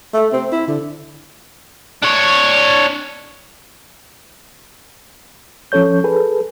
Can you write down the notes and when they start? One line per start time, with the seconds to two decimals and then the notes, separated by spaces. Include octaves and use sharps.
0.14 A3
0.33 C4
0.52 E4
0.67 D3
2.02 D4 C#5
5.72 F3 C#4 A4 C#5 G6
6.04 G#4 A4 B4